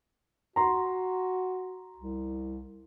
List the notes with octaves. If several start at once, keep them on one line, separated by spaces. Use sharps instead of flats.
F#4 A#5 C6
C2